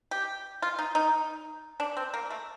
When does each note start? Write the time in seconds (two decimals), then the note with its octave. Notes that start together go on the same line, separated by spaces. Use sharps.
0.11 G4
0.62 F4
0.79 D#4
0.95 D#4
1.80 D4
1.97 C4
2.14 A#3
2.30 A3